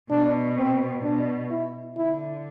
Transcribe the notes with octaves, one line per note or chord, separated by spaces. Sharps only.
B2 D4
C4
B2 D4
E4
D3 E4